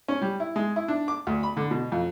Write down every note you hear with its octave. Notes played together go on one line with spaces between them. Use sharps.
C#4
G3
E4
G#3
E4
D4
D6
D2
B5
D3
B2
F2